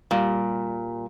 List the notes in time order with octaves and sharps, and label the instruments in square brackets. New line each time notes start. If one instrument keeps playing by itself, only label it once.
[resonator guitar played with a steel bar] A#2 [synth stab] G3